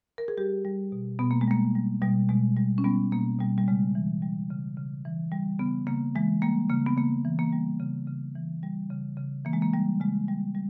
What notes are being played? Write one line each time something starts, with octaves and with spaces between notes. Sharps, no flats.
A#4
G#4
G3 G4
G3
B2
B2 B3
A#3
G#3
G3 A#3
G3
B2 G3
B2 G#3
G3
C#4
G3 B3
B2 A#3
B2 G3
G3
C#3 G#3
E3
G3
C#3
C#3
E3
G3
C#3 B3
C#3 A#3
E3 G#3
G3 A#3
C#3 A#3
B3
C#3 A#3
E3
A#3
G3
C#3
C#3
E3
G3
C#3
C#3
E3 A#3
G#3
A#3
G3
C#3 G#3
G3
G3